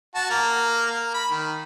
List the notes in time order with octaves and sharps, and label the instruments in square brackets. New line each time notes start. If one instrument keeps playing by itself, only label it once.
[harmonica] F#4 A5
A#3 A#5
A#4
B5
D#3